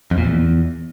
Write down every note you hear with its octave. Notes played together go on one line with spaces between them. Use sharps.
F2
A#2
E2